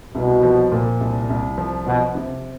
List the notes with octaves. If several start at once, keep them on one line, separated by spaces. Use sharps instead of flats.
C2 B2
F3
A#2
C2
C2
F3
B2 F3
C3